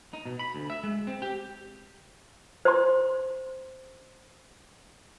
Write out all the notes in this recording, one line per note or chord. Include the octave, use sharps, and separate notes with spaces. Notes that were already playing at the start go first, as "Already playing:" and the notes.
D#4
B2
B5
D2
E5
G#3
C4
G4
C5 C6